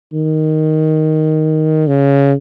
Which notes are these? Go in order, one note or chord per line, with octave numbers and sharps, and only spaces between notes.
D#3
C#3